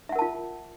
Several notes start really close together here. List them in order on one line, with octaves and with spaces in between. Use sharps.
E5 F#5 A#4 A5 F4